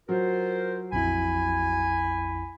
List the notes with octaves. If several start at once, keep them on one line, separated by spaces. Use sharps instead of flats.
F#3 F4 A#4 C5
A#1 F2 E4 G#5 B5